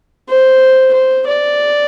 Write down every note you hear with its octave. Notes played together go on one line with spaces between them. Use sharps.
C5
C5
D5